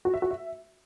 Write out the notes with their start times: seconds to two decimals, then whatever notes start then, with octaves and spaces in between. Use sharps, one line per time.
0.05 F#4
0.14 E5
0.22 F#4
0.31 E5